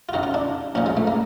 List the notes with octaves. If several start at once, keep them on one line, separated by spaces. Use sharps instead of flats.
F4
F#2 D#3 F#4
F4
D4
A#1 A#2 F3 C#4
G#3
A3
A#3